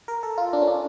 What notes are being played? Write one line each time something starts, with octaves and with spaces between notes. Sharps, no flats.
A#4
A4
F4
D4
C#4
D4